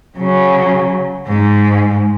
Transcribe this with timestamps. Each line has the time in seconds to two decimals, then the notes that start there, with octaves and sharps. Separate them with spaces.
0.18 C#3 F#3
1.27 G#2 G#3